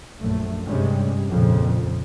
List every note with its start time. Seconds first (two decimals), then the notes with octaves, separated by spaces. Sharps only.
0.22 A#1 F#2 A3
0.66 G2 C3 G3 G#3 C#4
1.29 A#1 F2 A#2 C#3 F3